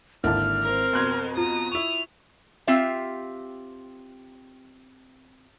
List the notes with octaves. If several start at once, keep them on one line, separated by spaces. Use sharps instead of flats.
G#1 D3 A#3 E4 A5 F6
C4 A#4
F2 B2 C6 F#6 G#6
F4 A#5 D#6
E4 C#6 F7
C4 F4 G4 E5 F5